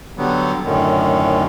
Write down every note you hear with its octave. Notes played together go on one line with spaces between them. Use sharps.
D3 F#3 G3 B3
F#2 A2 D3 D#3